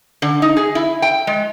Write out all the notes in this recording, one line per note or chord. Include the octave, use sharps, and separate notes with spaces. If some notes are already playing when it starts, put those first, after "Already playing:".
D3
D#4
G#4
E4
G5
G#3